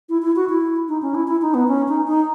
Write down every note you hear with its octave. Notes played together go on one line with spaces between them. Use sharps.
E4
E4
F#4
E4
D#4
C#4
E4
E4
D#4
B3
C#4
D#4
D#4